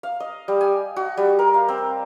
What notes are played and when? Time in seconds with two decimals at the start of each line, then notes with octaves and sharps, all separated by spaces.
0.03 F5
0.20 D#5
0.48 G3
0.61 G#5
0.96 F#4
1.17 G3
1.39 A#4
1.54 F5
1.69 C4